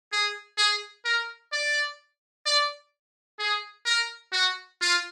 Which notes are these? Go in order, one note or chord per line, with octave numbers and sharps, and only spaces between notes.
G#4
G#4
A#4
D5
D5
G#4
A#4
F#4
F4